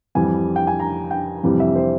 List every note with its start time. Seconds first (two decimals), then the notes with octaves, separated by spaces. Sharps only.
0.15 F2 E3 G3 G#5
0.56 G5
0.67 G#5
0.80 A#5
1.11 G5
1.43 F2 C3 E3 G3
1.60 E5
1.76 C5